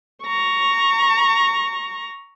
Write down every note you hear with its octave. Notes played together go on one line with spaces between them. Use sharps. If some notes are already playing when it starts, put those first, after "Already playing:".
A#5 C#6